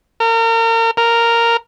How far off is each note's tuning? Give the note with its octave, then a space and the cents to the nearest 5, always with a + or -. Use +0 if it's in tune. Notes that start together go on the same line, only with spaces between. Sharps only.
A#4 -35
A#4 -5